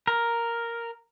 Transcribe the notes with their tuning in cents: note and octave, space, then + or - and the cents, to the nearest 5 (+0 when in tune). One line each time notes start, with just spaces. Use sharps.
A#4 +0